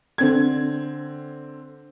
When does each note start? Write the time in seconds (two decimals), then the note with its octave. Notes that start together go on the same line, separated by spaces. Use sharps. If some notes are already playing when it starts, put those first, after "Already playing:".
0.18 D3 C4 G#6